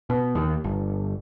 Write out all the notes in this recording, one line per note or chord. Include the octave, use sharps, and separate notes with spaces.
B2
D#2
G1